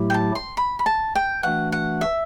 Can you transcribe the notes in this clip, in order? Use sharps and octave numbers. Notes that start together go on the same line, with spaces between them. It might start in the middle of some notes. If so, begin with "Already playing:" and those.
Already playing: A2 F#3 A3 E4 G4
G5
A5
C6
B5
B5
A5
G5
E3 A3 D4 F#4 F#5
F#5
E5